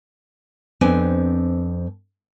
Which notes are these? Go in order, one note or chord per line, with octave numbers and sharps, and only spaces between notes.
F2 B3 C4 D4 G#5